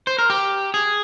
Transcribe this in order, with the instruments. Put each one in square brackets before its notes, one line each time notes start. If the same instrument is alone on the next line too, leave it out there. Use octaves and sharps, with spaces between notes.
[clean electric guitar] C5
A#4
G4
G#4